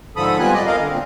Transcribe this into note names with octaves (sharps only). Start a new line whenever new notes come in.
G#2 D3 F3 A4 B5 D#6
G3 B3 C4 F4 G#5 F#6
D5 D#5
A#4 D#5 F5
D3
A#2 C4